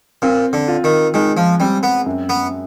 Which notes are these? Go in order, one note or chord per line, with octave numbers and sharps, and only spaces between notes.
A#2 C4
D3
F4
D#3
D#3 G#3
F3
G3 C4
B3
F#2
B3